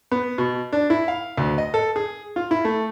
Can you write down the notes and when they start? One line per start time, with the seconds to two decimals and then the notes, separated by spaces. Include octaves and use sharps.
0.11 B3
0.38 B2
0.72 D4
0.90 E4
1.08 F5
1.37 D2
1.58 D#5
1.74 A4
1.96 G#4
2.36 F4
2.51 E4
2.65 A3